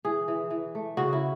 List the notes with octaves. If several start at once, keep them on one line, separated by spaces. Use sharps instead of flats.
E3 G#4
E3
E3
A3
C#3 F#4
E4